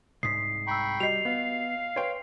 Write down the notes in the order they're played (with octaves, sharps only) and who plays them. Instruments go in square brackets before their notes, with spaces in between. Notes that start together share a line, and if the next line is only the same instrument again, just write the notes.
[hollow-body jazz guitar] C2 G#2 [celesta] D#6 B6 [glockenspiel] C7
[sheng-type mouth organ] G5 B5 C#6 [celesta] A#5 E6
[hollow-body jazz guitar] G3 [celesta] F#4 D#5 [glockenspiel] C7 F7
[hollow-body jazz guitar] B3 [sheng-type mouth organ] F5
[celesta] B4 C6 [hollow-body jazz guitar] C#5 G5